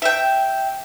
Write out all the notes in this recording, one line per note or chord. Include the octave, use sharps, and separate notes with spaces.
E5 G5